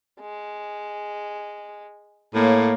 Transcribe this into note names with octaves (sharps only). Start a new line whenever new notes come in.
G#3
A2 A#3 C#5 F5